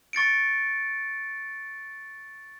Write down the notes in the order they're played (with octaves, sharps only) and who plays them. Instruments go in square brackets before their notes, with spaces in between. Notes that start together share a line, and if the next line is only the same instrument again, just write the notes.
[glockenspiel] C#6 A6 C#7 D7